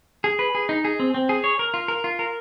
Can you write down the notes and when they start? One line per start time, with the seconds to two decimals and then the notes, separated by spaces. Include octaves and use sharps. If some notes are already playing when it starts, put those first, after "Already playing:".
0.24 G#4
0.39 B4
0.55 G#4
0.69 D#4
0.85 G#4
1.00 C4
1.14 C4
1.29 G#4
1.44 C#5
1.59 A#4
1.74 F4
1.88 A#4
2.04 F4
2.19 A#4